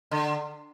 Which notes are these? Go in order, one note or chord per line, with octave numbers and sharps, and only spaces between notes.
D3